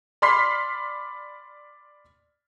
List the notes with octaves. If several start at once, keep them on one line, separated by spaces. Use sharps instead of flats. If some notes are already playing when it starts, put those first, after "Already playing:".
D5 B5 C6 F6 B6 C7